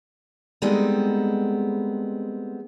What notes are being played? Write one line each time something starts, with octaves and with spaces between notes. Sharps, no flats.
G3 G#3 B3 C4 D#4 A4